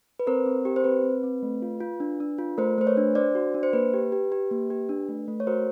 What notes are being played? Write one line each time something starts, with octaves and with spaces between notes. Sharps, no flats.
B4
C4 A#4 C5
C4
G4
C5
C4 B4
C4
C4
A3
F4
F4
D4
D4
F4
A3 A#4 C5
A3 C5
B4 C#5
D4
D4 C5 D5
F#4
D4
C5
A#3 B4
G4
G4
G4
A#3
G4
D4
A3
A3
C#5
F#4 A#4 C5